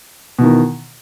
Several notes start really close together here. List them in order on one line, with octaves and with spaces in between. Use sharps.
B2 E3 D#3